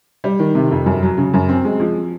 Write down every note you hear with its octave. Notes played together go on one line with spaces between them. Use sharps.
G3
D#3
C3
F2
F#2
F#3
C#3
F#2
C4
G#3
F3